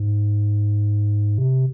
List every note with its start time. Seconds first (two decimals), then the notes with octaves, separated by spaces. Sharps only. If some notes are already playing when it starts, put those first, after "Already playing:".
Already playing: G#2
1.38 C3